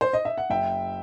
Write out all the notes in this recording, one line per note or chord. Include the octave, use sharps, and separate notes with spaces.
C5
D#5
E5
F#5
F#1 E5 G5